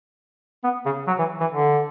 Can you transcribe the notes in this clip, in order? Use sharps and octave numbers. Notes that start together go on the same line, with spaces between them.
B3
C#3
F#3
E3
E3
D3